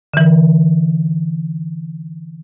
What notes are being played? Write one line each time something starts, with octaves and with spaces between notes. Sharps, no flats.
D3 E3